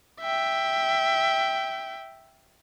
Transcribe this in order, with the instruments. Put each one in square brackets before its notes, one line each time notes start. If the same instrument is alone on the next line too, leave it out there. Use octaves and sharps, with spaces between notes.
[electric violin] E5 G5